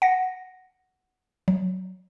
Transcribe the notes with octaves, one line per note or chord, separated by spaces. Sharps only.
F#5 A#6
F#3